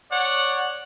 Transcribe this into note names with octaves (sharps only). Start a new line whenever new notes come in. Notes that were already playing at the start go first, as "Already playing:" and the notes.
C#5 D5 F#5